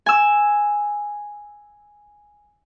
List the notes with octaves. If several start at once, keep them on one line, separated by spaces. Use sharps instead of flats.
G#5 E6